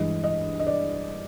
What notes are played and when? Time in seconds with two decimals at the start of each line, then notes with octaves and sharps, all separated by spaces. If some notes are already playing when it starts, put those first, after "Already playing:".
Already playing: G2 E3 G#3 D#5
0.24 D#5
0.59 D#5
0.67 D5